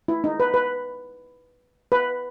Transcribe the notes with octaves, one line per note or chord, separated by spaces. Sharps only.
E4
D#4
B4
B4
B4